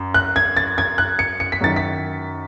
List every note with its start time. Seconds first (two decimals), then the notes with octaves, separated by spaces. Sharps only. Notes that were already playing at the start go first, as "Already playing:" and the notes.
Already playing: F#2
0.14 F#6
0.36 G#6
0.57 A6
0.78 G#6
0.98 F#6
1.19 C#7
1.40 C#7
1.52 B6
1.61 F#2 D#3 A6
1.76 B6